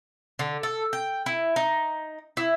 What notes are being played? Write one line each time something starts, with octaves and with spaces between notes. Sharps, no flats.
D3
A4
G5
E4
D#4
E4